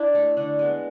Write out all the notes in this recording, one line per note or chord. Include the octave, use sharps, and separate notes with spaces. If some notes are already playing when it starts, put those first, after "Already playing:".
Already playing: D4 E4
A3
D3 D4
G#3 B3